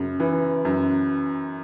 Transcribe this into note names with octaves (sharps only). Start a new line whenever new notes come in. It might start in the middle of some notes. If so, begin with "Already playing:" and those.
Already playing: F#2 C#3
E3
F#2